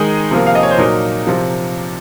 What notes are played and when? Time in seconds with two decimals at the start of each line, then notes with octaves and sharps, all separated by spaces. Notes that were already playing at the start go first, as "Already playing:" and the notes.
Already playing: D#3 G#3 D#4 G#4
0.31 C3 F3 A#3
0.47 F5
0.55 D#5
0.63 C#5
0.71 C5
0.78 A#2 F#3 A#3 D#4 A#4
1.27 C3 F3